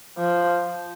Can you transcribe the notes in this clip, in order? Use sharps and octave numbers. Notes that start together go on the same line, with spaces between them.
F3